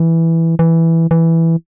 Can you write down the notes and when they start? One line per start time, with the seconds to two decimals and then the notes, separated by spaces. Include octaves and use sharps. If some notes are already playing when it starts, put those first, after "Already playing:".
Already playing: E3
0.59 E3
1.11 E3